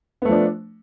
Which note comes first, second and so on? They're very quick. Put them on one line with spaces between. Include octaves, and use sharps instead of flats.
B3 A3 F3 D4